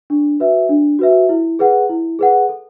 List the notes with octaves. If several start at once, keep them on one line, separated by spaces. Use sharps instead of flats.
D4
F#4 B4 E5
D4
F#4 B4 E5
E4
G#4 B4 F#5
E4
G#4 B4 F#5
A4